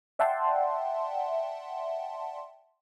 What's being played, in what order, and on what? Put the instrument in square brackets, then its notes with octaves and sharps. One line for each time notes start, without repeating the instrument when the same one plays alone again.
[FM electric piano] D5 E5 F#5 G5 A5 C6